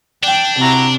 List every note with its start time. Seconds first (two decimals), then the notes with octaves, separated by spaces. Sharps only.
0.23 D4 G5
0.60 C3 E4 F#4 A#5